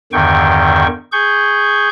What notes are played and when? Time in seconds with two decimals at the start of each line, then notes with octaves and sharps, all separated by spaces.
0.13 E2 G2 D3 D#3 G5 C#6
1.12 G#4 C#6 G6